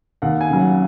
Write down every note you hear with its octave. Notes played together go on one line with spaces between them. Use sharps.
D#2 F#5
G#5
C#3 F#3
F#5